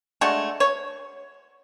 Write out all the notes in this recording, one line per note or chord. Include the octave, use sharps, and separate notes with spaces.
G#3 A3 D4 F#4
C#5